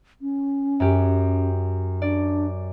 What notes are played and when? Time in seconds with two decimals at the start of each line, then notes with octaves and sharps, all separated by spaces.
0.22 C#4
0.80 F#2 G4
2.02 D4 D5